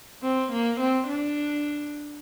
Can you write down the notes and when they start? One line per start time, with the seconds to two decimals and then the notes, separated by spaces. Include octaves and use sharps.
0.22 C4
0.51 A#3
0.80 C4
1.08 D4